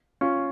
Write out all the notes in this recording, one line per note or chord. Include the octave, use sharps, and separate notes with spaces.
C#4 F4